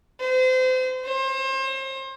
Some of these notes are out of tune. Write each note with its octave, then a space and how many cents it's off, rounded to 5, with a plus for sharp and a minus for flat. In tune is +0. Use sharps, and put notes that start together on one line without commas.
C5 -30
C5 +35